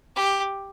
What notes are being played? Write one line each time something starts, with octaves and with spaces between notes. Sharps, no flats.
G4